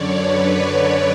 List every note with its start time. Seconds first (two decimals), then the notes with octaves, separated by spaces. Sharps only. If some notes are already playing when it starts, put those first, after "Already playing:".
Already playing: F#2 D3 C#5 D5
0.15 B4
0.56 C#5